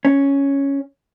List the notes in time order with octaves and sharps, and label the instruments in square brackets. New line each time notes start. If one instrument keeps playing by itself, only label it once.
[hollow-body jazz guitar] C#4